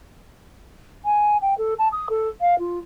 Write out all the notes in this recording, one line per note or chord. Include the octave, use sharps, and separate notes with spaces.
G#5
G5
A4
A5
D#6
A4
F5
F4